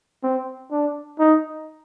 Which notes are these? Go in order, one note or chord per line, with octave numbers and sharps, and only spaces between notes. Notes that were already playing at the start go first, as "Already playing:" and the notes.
C4
D4
D#4